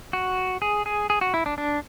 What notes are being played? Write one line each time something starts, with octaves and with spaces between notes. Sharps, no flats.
F#4
G#4
G#4
G#4
F#4
E4
D4
D4